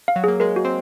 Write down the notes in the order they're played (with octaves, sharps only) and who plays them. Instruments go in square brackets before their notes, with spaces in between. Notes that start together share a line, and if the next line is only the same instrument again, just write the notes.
[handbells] F5
[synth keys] F#3
[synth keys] A#3 [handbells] G#4
[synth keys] G#3 [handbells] A#4
[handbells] F#4
[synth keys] C4